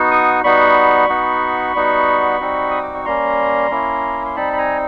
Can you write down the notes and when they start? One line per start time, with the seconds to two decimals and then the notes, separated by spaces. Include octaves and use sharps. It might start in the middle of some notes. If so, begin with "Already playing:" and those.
Already playing: B3 D#4 F#4
0.11 C#6 D#6
0.44 G3 B3 D#4 F#4 B5 C#6
1.09 B3 D#4 F#4
1.75 G3 B3 D#4 F#4
2.40 G3 C4 D#4 F#4
2.71 D#6
2.82 D6
2.94 C#6
3.05 G3 A#3 C#4 A#5 C6
3.71 A#3 C#4 E4
4.25 C6
4.36 G3 C4 D#4 A5 B5
4.53 B5
4.58 G#5 A#5